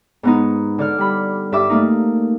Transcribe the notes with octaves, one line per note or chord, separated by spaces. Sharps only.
G#2 B3 D#4
D3 D5 F6
G3 B5
G2 E5 D6 E6
A3 A#3 D#4